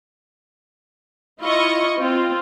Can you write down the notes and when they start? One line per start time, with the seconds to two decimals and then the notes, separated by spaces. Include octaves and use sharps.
1.42 E4 F4 D#5 C#6
1.98 C4 F4